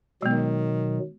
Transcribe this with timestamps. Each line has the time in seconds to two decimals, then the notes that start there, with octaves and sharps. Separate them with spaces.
0.22 B2 D#3 F#3 G#3 B3